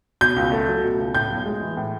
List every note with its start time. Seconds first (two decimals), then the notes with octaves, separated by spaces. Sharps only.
0.21 B2 G6
0.36 C#2
0.52 A3
0.68 F#3
0.84 B2
0.99 C#2
1.15 A2 G6
1.30 B1
1.46 G#3
1.61 E3
1.77 A2